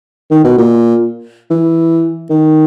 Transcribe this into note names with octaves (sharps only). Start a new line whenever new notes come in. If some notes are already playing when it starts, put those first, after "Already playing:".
D#3
B2
A#2
E3
D#3